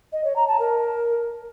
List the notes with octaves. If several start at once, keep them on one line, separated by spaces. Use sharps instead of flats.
D#5
C#5
A#5
A5
A#4